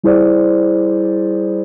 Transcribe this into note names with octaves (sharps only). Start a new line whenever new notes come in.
G3 E4 G#4 C5 D5